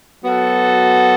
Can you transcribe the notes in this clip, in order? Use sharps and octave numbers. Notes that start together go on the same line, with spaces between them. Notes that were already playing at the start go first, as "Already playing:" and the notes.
F#3 B3 F#4 A4